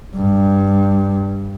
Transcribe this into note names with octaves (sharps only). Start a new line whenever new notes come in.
G2